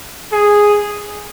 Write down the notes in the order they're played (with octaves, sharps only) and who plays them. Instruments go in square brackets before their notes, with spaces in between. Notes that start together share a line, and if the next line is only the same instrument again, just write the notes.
[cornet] G#4